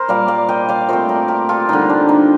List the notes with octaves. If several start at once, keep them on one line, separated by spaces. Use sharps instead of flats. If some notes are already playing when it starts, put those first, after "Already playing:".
Already playing: A#4 C5
A#2 G3 A#3 D5 F5
D5 F5
D#5 G5
D5 F5
A#2 A3 C4 C5 D#5
A#4 D5
G4 A#4
F4 A4
D3 G3 A#3 D#4
D4
D#4